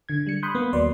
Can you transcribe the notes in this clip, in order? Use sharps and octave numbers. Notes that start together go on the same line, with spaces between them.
D3 G#6
G3 C#7
B5 C6 D#6 F#6 G6
A#3 B3
D#2 F#3 B4 D5 C6